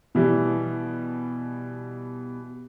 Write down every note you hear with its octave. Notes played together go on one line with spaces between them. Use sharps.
B2 E3 G3